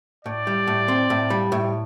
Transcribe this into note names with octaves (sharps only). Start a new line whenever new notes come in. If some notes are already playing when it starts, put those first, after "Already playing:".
A2 D5
G3
A2
C4
A2
G3
A2